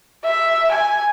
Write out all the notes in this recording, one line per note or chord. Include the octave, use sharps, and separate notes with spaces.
E5
G#5